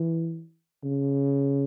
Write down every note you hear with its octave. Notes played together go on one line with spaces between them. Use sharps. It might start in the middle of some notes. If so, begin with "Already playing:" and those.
Already playing: E3
C#3